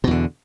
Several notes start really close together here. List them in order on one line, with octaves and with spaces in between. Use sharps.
B2 E2 D3